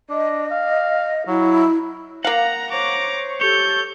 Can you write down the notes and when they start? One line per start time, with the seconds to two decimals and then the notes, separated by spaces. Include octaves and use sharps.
0.10 D4 D#5
0.51 F5
1.27 F#3 E4
2.24 A#3 F5 F#5 A#5
2.71 C5 C#5 A#5 C#6 D6
3.41 G4 A4 C#5 G6